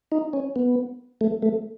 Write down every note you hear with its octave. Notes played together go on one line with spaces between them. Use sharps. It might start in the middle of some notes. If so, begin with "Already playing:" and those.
D#4
C#4
B3
A3
A3